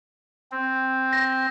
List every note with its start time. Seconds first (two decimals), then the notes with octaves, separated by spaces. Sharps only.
0.52 C4
1.13 A#6